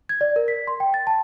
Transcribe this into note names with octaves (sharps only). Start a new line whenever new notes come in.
G#6
D5
A#4
B6
C6
G5
A6
A5